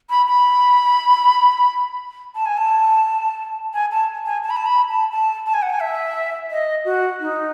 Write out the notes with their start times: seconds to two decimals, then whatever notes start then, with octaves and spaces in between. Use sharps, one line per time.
0.10 B5
0.27 B5
2.35 A5
2.46 G#5
2.57 A5
3.74 G#5
3.91 A5
4.26 G#5
4.43 A5
4.50 B5
4.57 A5
4.66 B5
4.89 A5
5.12 A5
5.46 A5
5.54 G#5
5.62 F#5
5.70 G#5
5.81 E5
6.51 D#5
6.85 F#4
7.20 D#4